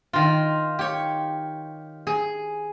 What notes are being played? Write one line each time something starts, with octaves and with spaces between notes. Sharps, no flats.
D#3 F4
G4 C#5
G#4